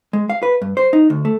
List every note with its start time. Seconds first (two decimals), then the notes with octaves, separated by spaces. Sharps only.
0.13 G#3
0.30 F5
0.43 B4
0.62 G2
0.77 C5
0.93 D#4
1.10 D2
1.25 A3